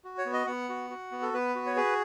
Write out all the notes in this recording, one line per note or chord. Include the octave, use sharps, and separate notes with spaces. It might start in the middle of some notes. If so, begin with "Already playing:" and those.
F#4
C#5
B3
D#5
B3 F#5
F#4
F#4
B3
A4
B3 B4
F#4
C#5
G#4 B4